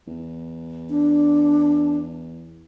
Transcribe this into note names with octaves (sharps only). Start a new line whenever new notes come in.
E2
D4